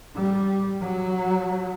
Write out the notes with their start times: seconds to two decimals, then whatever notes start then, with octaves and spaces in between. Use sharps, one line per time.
0.15 G3
0.81 F#3